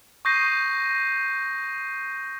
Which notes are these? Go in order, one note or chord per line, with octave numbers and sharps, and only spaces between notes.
C#6 D#6 G6 A#6 C7 D#7